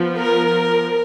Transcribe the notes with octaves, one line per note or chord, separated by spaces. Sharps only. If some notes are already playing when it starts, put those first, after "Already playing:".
Already playing: F3 B3
A#4